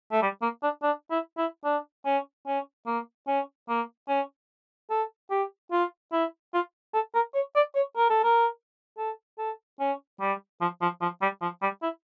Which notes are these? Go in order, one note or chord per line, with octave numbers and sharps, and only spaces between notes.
A3
G3
A#3
D4
D4
E4
E4
D4
C#4
C#4
A#3
C#4
A#3
C#4
A4
G4
F4
E4
F4
A4
A#4
C#5
D5
C#5
A#4
A4
A#4
A4
A4
C#4
G3
F3
F3
F3
G3
F3
G3
E4